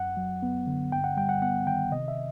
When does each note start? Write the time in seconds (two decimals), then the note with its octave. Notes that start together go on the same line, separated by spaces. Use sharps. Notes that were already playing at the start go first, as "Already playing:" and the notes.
Already playing: F#2 F#5
0.17 F#3
0.43 B3
0.67 D3
0.91 G2 G5
1.04 F#5
1.17 G3 G5
1.29 F#5
1.42 B3 F#5
1.66 D#3 G5
1.91 C3 D#5
2.08 E5